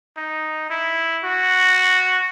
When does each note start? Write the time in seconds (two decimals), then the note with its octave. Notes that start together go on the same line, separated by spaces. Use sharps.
0.17 D#4
0.70 E4
1.24 F#4